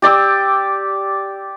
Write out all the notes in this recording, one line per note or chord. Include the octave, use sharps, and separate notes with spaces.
G4 D5 D6 E6